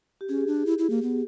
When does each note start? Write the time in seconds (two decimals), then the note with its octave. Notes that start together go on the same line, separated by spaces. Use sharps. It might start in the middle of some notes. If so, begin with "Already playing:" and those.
0.21 G4
0.29 C#4 G#4
0.47 D4
0.66 E4
0.78 E4
0.90 A#3
1.02 B3